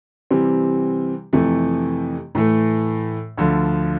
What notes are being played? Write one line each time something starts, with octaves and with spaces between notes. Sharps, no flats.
C3 E3 G3 C4
F2 C3 E3 A3
A2 E3 A3
D2 D3 F3